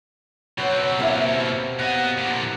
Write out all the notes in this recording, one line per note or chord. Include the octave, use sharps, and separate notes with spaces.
B2 F#3 C4 B4
C3 A#3 E4
B2 D#5 F#5
A#2 D3